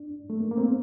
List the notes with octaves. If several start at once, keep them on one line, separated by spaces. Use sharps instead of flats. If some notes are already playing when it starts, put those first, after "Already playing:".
Already playing: D4
A3
A#3
A#3
C4
B3